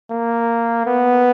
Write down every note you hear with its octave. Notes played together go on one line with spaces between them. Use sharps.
A#3
B3